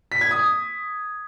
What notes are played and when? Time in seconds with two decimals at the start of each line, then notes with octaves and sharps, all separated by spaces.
0.12 B6
0.21 G#6
0.31 D#6